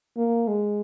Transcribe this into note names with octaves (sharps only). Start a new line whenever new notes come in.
A#3
G#3